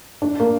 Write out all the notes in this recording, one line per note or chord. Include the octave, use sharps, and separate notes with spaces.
D4
A#3